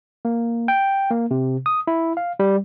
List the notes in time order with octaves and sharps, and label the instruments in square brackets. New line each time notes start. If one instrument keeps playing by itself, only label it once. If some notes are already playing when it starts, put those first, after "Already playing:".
[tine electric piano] A#3
G5
A#3
C3
D#6
E4
F5
G3